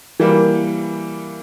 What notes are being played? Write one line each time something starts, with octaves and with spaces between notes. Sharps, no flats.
E3 G3 A#3